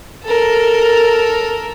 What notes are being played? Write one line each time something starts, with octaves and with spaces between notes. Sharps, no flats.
A4 A#4